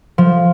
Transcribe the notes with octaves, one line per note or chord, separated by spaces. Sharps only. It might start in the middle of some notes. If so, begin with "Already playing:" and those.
F3